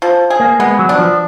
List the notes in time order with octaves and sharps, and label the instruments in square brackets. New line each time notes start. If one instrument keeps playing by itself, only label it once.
[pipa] F3
G#4
[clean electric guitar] A#3
[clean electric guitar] G#3 [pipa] B3
[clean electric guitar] F#3
[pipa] D4
[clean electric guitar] F3